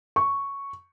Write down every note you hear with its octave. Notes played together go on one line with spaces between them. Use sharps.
C#6